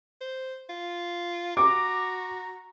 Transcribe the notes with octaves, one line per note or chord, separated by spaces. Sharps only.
C5
F4
F#4 A#5 D6